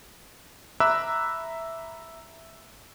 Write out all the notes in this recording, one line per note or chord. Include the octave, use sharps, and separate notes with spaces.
E5 A#5 B5 D6 E6 F#6